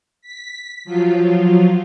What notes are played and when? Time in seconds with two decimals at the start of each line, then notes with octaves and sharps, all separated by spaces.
0.22 B6
0.85 F3 F#3 F4